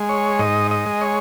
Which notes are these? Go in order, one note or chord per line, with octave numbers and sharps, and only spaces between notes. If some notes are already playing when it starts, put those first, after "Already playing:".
Already playing: G#3
C#5
G#2 D#5
D#5
G#3
C#5